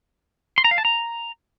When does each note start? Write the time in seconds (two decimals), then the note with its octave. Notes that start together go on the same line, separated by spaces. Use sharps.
0.58 C6
0.64 A#5
0.71 F5
0.78 A5
0.85 A#5